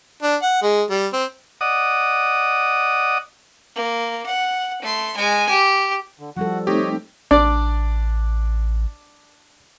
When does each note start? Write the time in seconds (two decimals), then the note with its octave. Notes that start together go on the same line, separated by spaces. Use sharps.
0.23 D4
0.42 F#5
0.62 G#3
0.90 G3
1.13 C4
1.61 D5 D#5 F#5 D#6
3.76 A#3
4.26 F#5
4.82 A3 C6
5.17 G#3 G#5
5.49 G4
6.19 D3
6.37 F3 G3 F#4 A4 F#5
6.67 A3 C4 D#4 G4 C#5 D#5
7.31 A1 D4 D5